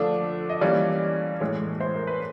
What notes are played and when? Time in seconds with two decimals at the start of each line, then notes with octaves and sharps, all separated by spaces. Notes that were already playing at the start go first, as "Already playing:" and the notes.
Already playing: D3 F3 A3 D4
0.50 D#5
0.61 E3 G3 A#3 C#4 D5
1.40 A2 E3 G#3 C#5
1.81 C5
1.95 A#4
2.07 B4